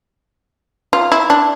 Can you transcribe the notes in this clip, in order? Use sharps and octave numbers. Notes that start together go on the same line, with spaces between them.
F4
E4
D4